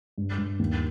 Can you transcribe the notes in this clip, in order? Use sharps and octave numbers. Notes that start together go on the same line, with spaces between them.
G2
G2
D#2